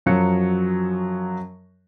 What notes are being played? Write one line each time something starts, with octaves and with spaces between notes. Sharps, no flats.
F#2 F3 F#3 C#7